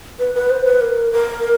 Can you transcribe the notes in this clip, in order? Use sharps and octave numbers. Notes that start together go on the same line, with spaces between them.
B4
B4
C5
B4
A#4
A#4